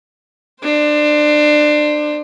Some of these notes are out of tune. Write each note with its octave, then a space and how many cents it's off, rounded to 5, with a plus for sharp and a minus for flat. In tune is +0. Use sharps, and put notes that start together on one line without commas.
D4 +25 C5 +0